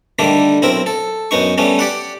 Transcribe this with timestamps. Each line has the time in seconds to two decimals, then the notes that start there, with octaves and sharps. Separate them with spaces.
0.19 D3 D#3 G3 A3 A#3
0.62 B1 C4 E4 A#4
0.86 A4
1.31 F#2 B3 D#4 C#6
1.58 G3 A3 B3 C#4
1.79 G4 D5 F#5